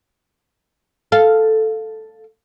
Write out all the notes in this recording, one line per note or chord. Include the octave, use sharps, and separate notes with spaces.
A4 F5